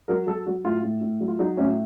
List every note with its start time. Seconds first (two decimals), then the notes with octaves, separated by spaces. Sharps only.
0.08 F#3 A#4
0.27 F#3 A4
0.46 F#3 F#4
0.64 A2 F4
0.82 A2
1.01 A2
1.20 F#3
1.28 F4
1.39 F#3 D#4
1.57 A2 C#4